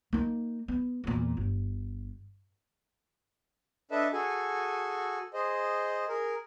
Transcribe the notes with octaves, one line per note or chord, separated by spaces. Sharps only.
A#3 D#4
B3
E2 A#2
G1
D4 A4 B4 D#5 E5 A5
F#4 G#4 A4 G#5
G#4 C5 D#5
G#4 A#4